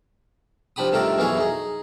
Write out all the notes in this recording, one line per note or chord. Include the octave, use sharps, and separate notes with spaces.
F3 D4 G4 B5 D#6
G2 D#3 A3 F4 A#4 D5
F#2 B2 E3 F#4 G#4 F5
D#4 G#4